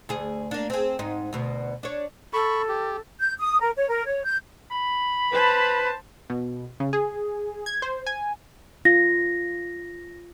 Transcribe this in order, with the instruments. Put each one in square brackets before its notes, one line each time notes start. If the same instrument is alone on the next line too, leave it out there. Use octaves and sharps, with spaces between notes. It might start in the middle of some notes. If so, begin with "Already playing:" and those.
[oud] D2 G#4
A#3 D4
C4 G#4
G#2 D#4
D2 B2
D4 C#5
[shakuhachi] A4 [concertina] B5 C#6
[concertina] G4
[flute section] G6
D#6
A#4
C#5
A#4
C#5
G6
[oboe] B5
[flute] B4 [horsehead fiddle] C5 A5
[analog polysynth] B2
C#3
G#4
G#6
C5
G#5
[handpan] F4 [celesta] A#6